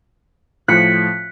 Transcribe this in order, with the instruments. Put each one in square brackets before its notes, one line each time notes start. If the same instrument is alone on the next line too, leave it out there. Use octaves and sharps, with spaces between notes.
[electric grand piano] A2 F3 [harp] F#6 B6 C#7